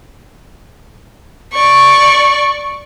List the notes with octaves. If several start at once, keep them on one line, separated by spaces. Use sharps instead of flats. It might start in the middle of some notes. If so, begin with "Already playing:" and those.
D5 C#6